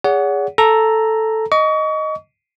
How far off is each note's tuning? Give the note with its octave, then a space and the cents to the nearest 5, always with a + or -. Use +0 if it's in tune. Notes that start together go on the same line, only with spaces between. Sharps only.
G#4 -20 C#5 +45 F#5 +0
A4 +0 A#5 +0
D#5 +0 C#6 +35